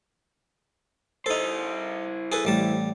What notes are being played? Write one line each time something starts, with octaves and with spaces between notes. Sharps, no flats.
D#4 E4 A4 C5
G#4 A4 B4
A1 G3 A5